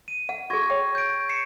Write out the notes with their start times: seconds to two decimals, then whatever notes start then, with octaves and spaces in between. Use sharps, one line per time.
0.08 D#7
0.29 F#5
0.50 F#4 G#4 C#6 G#6 A#6
0.70 C#5 G5
0.95 G6 D7
1.29 C7 C#7 E7